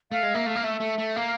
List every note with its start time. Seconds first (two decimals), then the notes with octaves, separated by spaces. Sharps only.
0.12 A3 F5
0.23 G#3
0.35 A#3 E5
0.45 A3 F5
0.56 A#3
0.63 A3 E5
0.81 A3
0.98 A3
1.16 A#3 F5